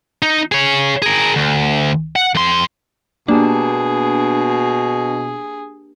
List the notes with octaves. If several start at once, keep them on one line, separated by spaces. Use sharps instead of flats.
D#4
G#4 C#5
G#4 A#4
D2
F#5
F2 C6
B2 A#3 D4 G4 G#4 A5